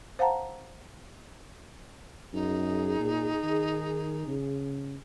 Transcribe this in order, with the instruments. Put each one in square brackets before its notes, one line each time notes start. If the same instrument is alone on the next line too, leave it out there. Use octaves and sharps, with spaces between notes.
[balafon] C5 F5 F#5 A5 A#5
[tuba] F#2 [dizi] D#4 [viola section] G#4
[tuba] A#2
D#3
C#3